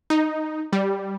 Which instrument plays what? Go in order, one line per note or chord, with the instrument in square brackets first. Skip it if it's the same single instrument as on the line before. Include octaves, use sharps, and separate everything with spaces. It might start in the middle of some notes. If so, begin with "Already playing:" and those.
[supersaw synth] D#4
G3